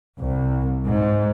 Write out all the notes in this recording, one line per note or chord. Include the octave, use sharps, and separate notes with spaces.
C2
G#2